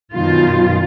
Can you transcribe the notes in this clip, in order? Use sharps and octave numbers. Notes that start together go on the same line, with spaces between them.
F#2 B2 D#3 F4